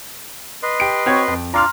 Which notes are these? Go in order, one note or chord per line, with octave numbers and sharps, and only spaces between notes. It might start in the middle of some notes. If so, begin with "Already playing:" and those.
B4 D#5 C6
G4 D7
C4 F#4 C#5
F2
D4 F4 D5 A#5 C6 F6